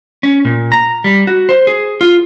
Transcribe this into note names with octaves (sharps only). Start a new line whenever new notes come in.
C#4
A#2
A#5
G3
F#4
C5
G#4
F4